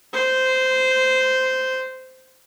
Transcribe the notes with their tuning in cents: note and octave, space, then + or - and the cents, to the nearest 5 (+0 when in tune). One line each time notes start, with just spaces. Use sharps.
C5 -10